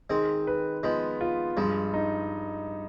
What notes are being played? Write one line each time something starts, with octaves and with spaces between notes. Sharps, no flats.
D#3 G#3 C4
B4
F3 G#3 B3
F4
G2 F3 G#3
D#4